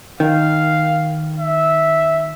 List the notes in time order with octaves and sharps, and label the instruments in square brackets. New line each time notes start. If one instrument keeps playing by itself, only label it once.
[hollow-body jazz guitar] D#3 [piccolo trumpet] F5
[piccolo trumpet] E5